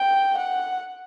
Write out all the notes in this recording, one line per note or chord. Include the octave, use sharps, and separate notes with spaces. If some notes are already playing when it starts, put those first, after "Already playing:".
Already playing: G5
F#5